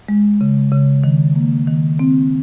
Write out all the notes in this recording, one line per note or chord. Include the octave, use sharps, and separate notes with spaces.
G#3
C#3
C#3
D#3
A#3
D#3
C4